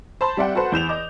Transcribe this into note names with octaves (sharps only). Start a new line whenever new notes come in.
C5 A5 B5 C6
G3 C4 D5 E5 F#5 G5
F#4 A4 B4 C5 F#5
E2 G6 E7 F7
D#5 D6